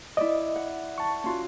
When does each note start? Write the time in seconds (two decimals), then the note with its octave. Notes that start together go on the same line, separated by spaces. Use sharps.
0.17 E4 D5 D#5
0.56 F#5
0.98 A5 C#6
1.24 C#4 F4 F#4